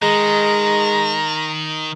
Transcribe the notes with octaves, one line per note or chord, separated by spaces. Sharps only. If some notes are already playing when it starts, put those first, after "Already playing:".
D#3 G#3 A#5